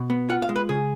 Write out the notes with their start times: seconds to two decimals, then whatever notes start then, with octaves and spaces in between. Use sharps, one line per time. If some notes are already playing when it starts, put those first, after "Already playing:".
Already playing: B2
0.10 B3
0.29 F4 F#5
0.42 F5
0.49 G#3
0.56 B4
0.69 C#3 G#4